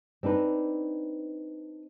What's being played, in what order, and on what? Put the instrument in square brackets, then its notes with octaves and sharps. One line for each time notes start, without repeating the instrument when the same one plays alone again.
[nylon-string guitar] C4 D4 D#4 B4